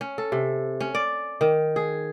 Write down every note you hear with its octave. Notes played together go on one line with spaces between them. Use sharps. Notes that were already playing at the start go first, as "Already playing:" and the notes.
C#4
A4
C3
C#4
D5
D#3
G#4